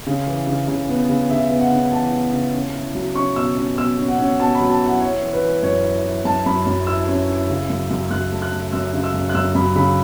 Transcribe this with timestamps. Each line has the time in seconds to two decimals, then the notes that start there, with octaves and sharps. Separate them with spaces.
0.07 C#3
0.27 E3
0.47 C#3
0.67 C#3
0.89 B3
1.09 C#3
1.30 C#3 E5
1.51 B3
1.61 F#5
1.71 C#3
1.92 E3 A5
2.13 B3
2.33 C#3
2.54 C#4
2.74 E4
2.95 F#3
3.15 C#4 C#6
3.36 B2 E6
3.57 C#4
3.77 B2 E6
3.98 C#4
4.08 F#5
4.19 C#4
4.40 B2 A5
4.55 B5
4.61 F#3
4.70 A5
4.81 E4 F#5
5.01 E4 C#5
5.22 E3
5.33 B4
5.43 E3
5.63 F#2 C#5
5.84 E4
6.05 E4
6.25 F#2 A5
6.46 F#2 B5
6.66 F#2
6.87 E4 E6
7.08 C#4
7.28 E4
7.49 C#3
7.70 F#2
7.91 F#2
8.11 F#2 F#6
8.32 A3
8.42 F#6
8.52 A3
8.72 F#2 E6
8.93 C#3
9.04 E6
9.14 F#2
9.29 F#6
9.34 F#2 E6
9.55 F#2 B5
9.75 C#3 B5